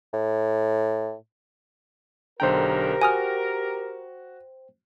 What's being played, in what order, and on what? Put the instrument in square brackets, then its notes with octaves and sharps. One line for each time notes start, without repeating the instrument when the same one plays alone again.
[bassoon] A2
[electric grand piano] B1 D3 A#5 [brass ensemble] G4 A#4 [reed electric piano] C5 G5
[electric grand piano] F#4 [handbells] G#5 D#6 F6